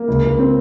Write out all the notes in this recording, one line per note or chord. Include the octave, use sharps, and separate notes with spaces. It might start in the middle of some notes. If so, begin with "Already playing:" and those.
Already playing: A#3
C#2
C#2
C4